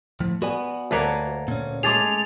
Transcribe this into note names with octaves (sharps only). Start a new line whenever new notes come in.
A2 F3
B3 F#4 D5 G#5
D2 A#3 A4 B4 C#5
A#2 C#4
G#3 A3 G#4 D6 A6 F7